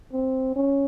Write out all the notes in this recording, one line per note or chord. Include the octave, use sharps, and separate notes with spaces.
C4
C#4